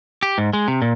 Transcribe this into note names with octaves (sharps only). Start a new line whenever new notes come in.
G4
G#2
G#3
C3
A#2